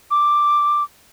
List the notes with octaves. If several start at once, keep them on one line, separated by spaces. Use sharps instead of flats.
D6